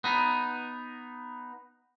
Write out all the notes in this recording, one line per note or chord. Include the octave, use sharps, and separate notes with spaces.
B3 D#4